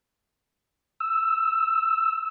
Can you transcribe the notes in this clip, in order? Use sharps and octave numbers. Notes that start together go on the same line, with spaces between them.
E6